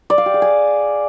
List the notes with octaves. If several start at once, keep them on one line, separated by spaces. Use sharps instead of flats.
D5
F5
G4
G#4
G#5